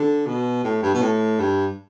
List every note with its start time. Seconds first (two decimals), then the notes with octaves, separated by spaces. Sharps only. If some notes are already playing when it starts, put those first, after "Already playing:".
Already playing: D3
0.26 B2
0.64 A2
0.83 G2
0.94 B2
1.02 A2
1.40 G2